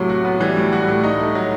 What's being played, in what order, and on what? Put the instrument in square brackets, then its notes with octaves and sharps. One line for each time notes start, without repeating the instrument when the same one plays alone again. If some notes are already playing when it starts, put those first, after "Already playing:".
Already playing: [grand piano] A2 C3 [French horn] F#3
[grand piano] F#4
B3
[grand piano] E3 [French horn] G3
[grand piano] A2
F#4
A2
D#4
A3
F#3